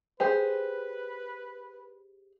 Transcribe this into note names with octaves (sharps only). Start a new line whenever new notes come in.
G4 G#4 B4 C5